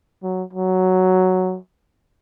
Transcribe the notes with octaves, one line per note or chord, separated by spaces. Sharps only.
F#3
F#3